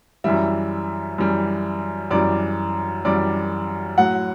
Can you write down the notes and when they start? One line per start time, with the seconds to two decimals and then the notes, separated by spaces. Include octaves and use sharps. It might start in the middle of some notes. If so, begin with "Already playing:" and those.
0.24 F#2 E3 G3 E5
1.18 F#2 E3 G3
2.11 F#2 E3 G3 D5
3.05 F#2 E3 G3 D5
3.98 A2 F#3 F#5